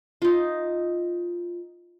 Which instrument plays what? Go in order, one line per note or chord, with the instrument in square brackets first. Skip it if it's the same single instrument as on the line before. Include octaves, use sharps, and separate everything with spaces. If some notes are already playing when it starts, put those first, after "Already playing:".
[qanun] D#4 F4